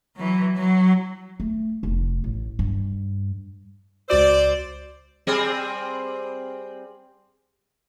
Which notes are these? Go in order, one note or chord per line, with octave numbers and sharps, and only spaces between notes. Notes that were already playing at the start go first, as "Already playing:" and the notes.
E3 F#3
F#3
A3
F1
A1
G2
C#2 F#4 C5 D5 E6
G3 C4 G#4